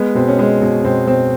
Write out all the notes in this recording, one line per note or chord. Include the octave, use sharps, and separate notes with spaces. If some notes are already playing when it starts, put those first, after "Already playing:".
Already playing: G#3 B3
B2 C4
C#4
G#3
B2
B2 C4
B2 C4